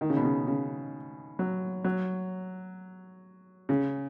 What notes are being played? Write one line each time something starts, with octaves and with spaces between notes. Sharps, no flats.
D#3
C#3
B2
C#3
C#3
F#3
F#3
C#3